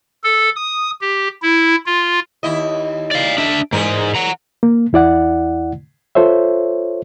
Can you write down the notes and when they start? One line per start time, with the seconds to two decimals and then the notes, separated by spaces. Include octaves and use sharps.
0.24 A4
0.56 D#6
1.01 G4
1.42 E4
1.86 F4
2.43 D#2 E4 D#5
3.11 D5 F5
3.38 D4 E5
3.73 E2 G#2 G#3 A#4
4.15 F#5 A#5
4.63 A#3
4.93 E2 E4 D5 F#5
6.15 F4 A4 C5 C#5 E5